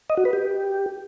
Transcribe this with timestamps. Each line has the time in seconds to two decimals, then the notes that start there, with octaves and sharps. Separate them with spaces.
0.10 D#5
0.17 F#4
0.25 B4
0.33 G4